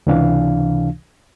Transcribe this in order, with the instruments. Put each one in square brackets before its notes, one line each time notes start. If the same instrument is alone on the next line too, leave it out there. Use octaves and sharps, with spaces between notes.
[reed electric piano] C#2 C3 E3 D4 F5